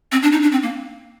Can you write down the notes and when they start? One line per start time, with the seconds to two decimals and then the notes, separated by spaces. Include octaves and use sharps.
0.12 C4
0.23 D4
0.32 D#4
0.42 D4
0.52 C4
0.63 A#3